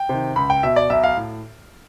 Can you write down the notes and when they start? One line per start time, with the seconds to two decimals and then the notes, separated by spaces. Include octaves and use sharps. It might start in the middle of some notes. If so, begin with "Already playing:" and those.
Already playing: G5
0.09 C3 D#3
0.36 C#2 B5
0.50 G5
0.63 B2 E5
0.76 D5
0.90 B1 E5
1.04 F5
1.17 A2